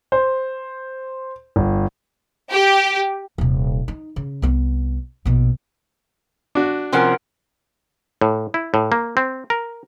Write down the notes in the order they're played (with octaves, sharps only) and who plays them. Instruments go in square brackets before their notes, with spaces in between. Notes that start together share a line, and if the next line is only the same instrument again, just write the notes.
[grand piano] C5
G1
[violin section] G4
[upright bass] D#1 C3
D#4
C#3
C2 B3
A#1 B2
[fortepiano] D4 F#4
[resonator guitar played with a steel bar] C3 F3 C#4 [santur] A#4 F#5 C6
[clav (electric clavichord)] A2
E4
A2
A#3
C4
A#4